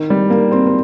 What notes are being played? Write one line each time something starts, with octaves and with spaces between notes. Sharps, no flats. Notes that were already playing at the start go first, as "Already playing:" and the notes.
Already playing: D#3
G3
A#3
C4
C4